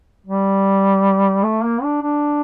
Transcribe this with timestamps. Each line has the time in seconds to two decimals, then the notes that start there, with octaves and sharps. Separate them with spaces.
0.27 G3
1.43 A3
1.63 A#3
1.83 D4
2.02 D4